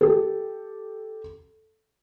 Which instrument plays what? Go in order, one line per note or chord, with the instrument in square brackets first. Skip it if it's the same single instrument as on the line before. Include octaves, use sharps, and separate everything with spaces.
[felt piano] G4 A4